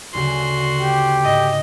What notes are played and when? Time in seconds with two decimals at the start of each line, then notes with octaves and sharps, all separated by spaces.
0.14 D2 C#3 F#4 C6
0.81 G4
1.24 G#2 D#5